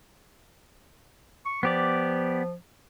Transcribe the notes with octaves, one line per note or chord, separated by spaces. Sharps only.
C#6
F3 B3 G4 D5